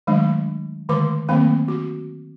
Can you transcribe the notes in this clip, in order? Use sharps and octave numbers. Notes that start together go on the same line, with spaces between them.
D#3 F#3 G#3 A3 D4
D3 D#3 G#3 A3 B4 D6
D#3 F#3 A3 A#3 C4 F5
F#4